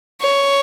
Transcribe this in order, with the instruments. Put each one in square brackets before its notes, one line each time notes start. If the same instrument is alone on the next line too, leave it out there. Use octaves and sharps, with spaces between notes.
[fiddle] C#5